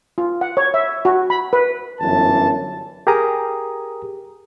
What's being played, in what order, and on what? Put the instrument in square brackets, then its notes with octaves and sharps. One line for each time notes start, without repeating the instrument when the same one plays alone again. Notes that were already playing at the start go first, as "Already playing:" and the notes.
[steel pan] F4
F#5
C#5
E5
F#4
B5
B4
[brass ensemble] G1 F#2 E3 A5
[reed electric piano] G4 G#4 A#4 A#5 D#6